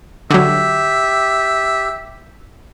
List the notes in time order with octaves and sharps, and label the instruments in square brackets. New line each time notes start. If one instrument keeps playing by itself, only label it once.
[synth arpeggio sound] D3 F#3 [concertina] G4 [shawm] E5